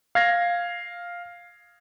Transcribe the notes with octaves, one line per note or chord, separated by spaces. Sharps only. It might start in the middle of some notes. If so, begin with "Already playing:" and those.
F5 G#6 A#6